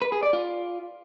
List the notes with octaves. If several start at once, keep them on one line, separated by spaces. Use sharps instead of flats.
B4
G#4
D5
F4